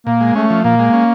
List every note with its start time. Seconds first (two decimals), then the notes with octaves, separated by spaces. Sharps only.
0.06 A#2 A#3
0.21 G#3
0.35 A3 C#4
0.50 F3
0.64 A#2 A#3
0.79 G#3
0.93 C#4